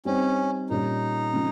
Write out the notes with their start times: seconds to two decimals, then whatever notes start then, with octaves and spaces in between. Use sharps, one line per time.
0.05 G3 C4 C#4 D#4
0.70 A#2 G3 C#4 D#4
1.33 C#3 F3 G#3 C4